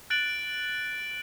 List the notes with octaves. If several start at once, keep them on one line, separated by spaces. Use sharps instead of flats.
F#6 A6 D7 F#7